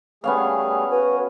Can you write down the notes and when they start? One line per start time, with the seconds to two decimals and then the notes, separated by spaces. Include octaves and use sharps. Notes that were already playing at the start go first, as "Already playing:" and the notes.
0.24 G3 A3 B3 C#4 G#4 F5
0.91 F#4 B4 G#5